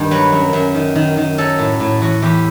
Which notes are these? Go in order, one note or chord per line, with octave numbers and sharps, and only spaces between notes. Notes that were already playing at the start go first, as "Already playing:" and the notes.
Already playing: G2 D#3
F#3 B4
F#2
F#2
D#3
D#3
D#3
F#3 A4
A2
A2
E2 F#4
E2 G4